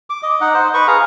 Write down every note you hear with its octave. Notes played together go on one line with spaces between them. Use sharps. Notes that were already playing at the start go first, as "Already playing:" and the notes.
D6
D#5
D#4 F#5
C5 D#5
B4 C#6
G#4 F5 A#5